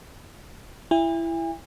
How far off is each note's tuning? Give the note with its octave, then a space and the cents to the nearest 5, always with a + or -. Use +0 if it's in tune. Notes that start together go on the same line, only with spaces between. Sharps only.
E4 +15 G#5 -45